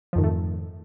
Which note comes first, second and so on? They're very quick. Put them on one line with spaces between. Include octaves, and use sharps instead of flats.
F3 F2 D#3 G#2 A3